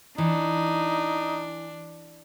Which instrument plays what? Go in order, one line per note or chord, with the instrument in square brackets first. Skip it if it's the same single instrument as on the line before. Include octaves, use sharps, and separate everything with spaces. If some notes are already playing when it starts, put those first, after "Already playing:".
[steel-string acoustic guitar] E3 [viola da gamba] D4 [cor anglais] D#4